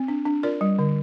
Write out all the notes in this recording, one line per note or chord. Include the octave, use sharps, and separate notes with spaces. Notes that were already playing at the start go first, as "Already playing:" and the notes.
Already playing: C4
D4
D4
F4 A#4 D5
G3
D3